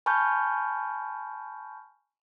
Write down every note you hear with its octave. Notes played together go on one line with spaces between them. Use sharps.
G#5 A5 B5 C#6 F6 G6